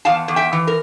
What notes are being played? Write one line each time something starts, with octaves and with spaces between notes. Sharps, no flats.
E2 F5 A5
E2
E5 G5
E3
A#4